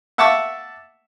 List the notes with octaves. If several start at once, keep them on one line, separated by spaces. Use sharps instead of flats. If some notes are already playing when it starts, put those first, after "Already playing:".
E5 F#5 A5 C#6 D6 E6